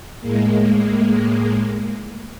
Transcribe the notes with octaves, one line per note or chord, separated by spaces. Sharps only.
A2 G#3 A#3